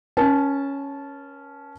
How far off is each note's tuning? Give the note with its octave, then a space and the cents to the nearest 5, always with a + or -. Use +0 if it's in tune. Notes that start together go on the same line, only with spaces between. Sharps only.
C#4 +0 A#4 +40 A5 -20